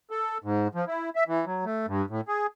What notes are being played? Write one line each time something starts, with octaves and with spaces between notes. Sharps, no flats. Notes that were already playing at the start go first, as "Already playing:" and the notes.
A4
G#2
F3
E4
E5
E3
F#3
A3
G2
A2
G#4